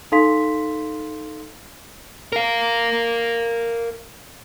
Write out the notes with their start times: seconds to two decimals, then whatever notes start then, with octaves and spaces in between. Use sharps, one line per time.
0.12 D#4 A4 F5 C6 B6
2.32 A#4 F5